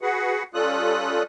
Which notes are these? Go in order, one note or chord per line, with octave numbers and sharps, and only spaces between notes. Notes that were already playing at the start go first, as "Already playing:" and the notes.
F#4 G#4 B4 F#5
G3 C#4 F4 A4 D#6 F#6